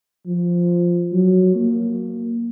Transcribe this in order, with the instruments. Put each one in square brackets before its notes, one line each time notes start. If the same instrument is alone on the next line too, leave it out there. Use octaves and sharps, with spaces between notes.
[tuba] F3
F#3
A#3